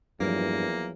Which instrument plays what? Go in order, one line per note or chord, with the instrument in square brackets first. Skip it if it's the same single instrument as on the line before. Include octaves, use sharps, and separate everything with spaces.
[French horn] E2 [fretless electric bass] G2 [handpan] F3 F#3 [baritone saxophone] A#3